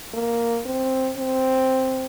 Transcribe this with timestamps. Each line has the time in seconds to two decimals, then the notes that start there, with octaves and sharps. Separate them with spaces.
0.14 A#3
0.65 C4
1.17 C4